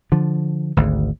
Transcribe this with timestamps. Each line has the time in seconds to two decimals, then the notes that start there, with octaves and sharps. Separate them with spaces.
0.12 D3 F3
0.77 G#1 D2